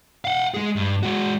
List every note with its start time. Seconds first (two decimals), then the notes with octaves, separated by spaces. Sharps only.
0.25 F5 F#5
0.54 G#3 G#4
0.76 G2
1.03 G#3 F#4